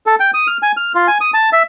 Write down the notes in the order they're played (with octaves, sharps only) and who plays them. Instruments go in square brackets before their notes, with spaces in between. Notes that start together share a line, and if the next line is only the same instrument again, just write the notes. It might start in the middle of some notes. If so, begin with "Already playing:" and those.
[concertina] A4
G5
D#6
F6
G#5
F6
F4
G#5
D#6
A5
E5